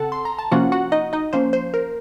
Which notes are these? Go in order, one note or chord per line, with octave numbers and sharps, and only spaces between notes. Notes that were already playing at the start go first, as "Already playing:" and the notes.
Already playing: C#3 C4 A4 F#5 A5
C6
A#5
A5
C3 F3 A#3 C#4 F4 F#4 F#5
F#4 F#5
D#4 D#5
D#4 D#5
F3 A#3 C#4 C5
C5
A#4